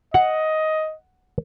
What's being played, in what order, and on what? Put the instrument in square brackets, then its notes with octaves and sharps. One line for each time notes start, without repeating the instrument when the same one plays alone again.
[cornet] D#5 [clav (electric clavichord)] F#5